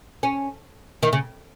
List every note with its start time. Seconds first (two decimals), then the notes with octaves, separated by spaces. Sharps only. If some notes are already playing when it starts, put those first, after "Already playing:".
0.23 C#4
1.03 D#3
1.13 C#3